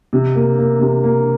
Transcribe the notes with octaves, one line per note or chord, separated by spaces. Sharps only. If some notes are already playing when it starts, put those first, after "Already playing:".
C3
A#3
A#3
C3
A#3